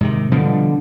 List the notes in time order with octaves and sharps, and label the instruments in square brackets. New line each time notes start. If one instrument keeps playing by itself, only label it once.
[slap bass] G#2 C3 D#3
[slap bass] B2 F3 G3 [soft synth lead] D3